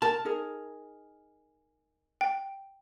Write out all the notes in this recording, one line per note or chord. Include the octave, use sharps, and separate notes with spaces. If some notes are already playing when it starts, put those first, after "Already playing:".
A#4 A5
D#4 G#4 A#4
G5